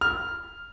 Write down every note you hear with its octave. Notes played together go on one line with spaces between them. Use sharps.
F6